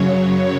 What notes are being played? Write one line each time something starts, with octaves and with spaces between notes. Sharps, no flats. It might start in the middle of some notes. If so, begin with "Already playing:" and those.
Already playing: F#2 C#3 F#3 C#5